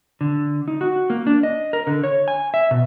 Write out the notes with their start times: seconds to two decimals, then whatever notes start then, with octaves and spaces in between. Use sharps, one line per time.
0.21 D3
0.68 D#4
0.81 F#4
1.10 A#3
1.27 D4
1.43 D#5
1.73 A#4
1.87 D3
2.04 C#5
2.28 G#5
2.54 E5
2.71 B2